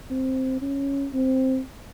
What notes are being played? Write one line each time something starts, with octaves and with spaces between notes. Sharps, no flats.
C4
C#4
C4